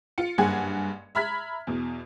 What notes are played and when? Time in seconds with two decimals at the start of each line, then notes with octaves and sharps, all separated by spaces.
0.18 F4 C#7
0.38 F#1 G2 G#4 F#5 G#5 G#6
1.15 E5 A#5 B5 F6 G#6 B6
1.67 E2 B2